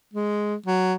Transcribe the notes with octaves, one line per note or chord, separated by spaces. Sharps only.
G#3
F#3